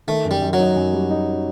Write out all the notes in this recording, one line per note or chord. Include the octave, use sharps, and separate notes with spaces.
D#3 A3
F#2
G3
F#2
F#3
D#4
F#2
G3
D#4